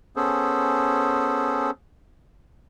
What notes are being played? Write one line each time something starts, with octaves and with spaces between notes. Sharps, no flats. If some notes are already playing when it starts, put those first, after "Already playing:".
B3 C#4 G#4 A4 C5